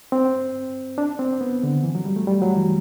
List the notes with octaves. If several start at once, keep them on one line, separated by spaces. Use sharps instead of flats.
C4
D4
C4
B3
D3
E3
F#3
G3
A3
G3
F#3
E3